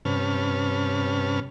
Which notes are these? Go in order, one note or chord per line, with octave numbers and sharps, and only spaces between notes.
G2 C3 C#4 B4 A5 F6